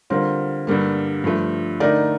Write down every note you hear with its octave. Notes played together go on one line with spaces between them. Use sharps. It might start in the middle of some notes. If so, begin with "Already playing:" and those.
D3 G3 C4 F4 A#4
G2 D3 G3 A#3
G2 F3 A3
D3 A3 D#4 A#4 D5